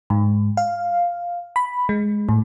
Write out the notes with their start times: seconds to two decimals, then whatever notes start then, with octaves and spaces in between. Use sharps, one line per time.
0.10 G#2
0.57 F5
1.56 B5
1.89 G#3
2.29 A2